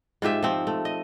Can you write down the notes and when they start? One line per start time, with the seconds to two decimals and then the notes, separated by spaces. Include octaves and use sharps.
0.22 G#2 F4 G4 E5
0.43 F3 C4
0.67 A3
0.85 D#5